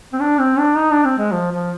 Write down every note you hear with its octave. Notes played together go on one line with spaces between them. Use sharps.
C4
D4
C4
D4
D#4
D4
C4
G#3
F3
F3